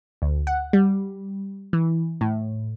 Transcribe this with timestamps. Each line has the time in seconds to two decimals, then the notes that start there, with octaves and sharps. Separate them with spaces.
0.22 D2
0.47 F#5
0.73 G3
1.73 E3
2.21 A2